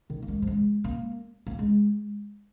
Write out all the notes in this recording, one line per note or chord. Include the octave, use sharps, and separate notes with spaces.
D#3
A#3
G#3
F3
G#3
A#3
A#3
G#3